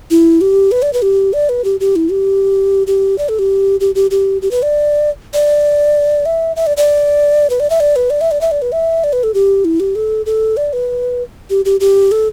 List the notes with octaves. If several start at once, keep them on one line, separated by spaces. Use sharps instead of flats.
E4
G4
B4
D5
B4
G4
D5
B4
G4
G4
E4
G4
G4
D5
A4
G4
G4
G4
G4
G4
B4
D5
D5
E5
E5
D5
D5
B4
D5
E5
D5
B4
D5
E5
D5
E5
D5
B4
E5
D5
B4
A4
G4
E4
G4
A4
A4
D5
B4
G4
G4
G4
A4